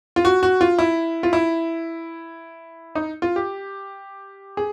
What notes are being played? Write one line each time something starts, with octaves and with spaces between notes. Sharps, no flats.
F4
F#4
F#4
F4
E4
F4
E4
D#4
F4
G4
G#4